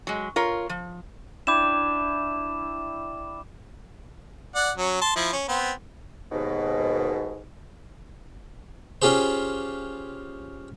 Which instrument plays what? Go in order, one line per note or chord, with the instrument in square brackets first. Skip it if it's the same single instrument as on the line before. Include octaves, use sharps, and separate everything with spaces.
[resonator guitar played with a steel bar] F#3 G#3
F4 A#4 C#5
F3
[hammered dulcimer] D4 E4 G5 [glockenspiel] D6 E7
[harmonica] D5 F#5
F#3 C#4
A5 C6
F3 E4
C#4
B3 C4
[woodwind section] D#2 G#2 B2
[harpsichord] C#4 F4 G4 G#4 C5